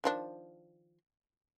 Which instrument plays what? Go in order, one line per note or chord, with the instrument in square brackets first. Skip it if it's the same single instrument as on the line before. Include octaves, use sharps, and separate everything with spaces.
[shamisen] D#3 F3 D4